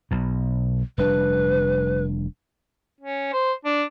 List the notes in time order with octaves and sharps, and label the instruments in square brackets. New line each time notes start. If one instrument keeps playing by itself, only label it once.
[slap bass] B1 B2
[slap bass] F1 G3 D4 [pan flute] B4
[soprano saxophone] C#4
C5
D4